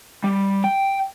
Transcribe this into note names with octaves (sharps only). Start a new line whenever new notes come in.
G3
G5